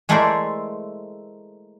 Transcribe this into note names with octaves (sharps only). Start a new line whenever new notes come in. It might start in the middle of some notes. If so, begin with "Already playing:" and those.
G#3 A3 E4 A#4 C5 D5